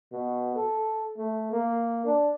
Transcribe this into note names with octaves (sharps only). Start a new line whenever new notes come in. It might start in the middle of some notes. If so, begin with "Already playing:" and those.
B2
A4
A3
A#3
D4